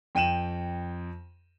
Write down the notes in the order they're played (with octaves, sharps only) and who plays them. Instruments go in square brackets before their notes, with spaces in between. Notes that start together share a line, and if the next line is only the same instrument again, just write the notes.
[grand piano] F2 G5 D#7 E7 F#7